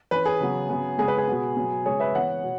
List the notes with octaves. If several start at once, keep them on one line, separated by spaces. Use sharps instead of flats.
E3 C#4 B4
G#4
C#3 F#3 B3
C#3 F#3 B3
C#3 G#3 B3 G#4
B4
G#4
B2 B3
B2 F#3 B3
C#3 G#3 C#4 G#4 C#5
B4 E5
E3 B3 C#5 F#5
B2